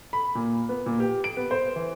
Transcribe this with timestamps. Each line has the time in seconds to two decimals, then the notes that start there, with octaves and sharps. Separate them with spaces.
0.13 B5
0.35 A#2
0.69 B3
0.86 A#2
1.00 G4
1.24 D7
1.37 B3
1.51 C5
1.76 E3